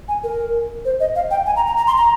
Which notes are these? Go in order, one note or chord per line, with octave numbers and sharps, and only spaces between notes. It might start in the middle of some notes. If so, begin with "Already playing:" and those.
G#5
A#4
C5
D#5
F5
G5
G#5
A#5
A#5
A#5
C6
A#5